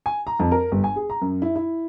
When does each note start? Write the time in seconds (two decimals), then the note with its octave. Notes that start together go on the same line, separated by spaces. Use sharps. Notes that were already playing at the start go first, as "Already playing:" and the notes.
0.06 G#5
0.27 A#5
0.39 F2
0.51 A#4
0.72 G1
0.84 G#5
0.96 G#4
1.10 A#5
1.22 F#2
1.42 E4
1.56 E4